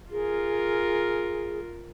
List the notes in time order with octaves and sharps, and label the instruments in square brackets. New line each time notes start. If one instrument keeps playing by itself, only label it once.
[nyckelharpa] F4 A#4 [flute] G#4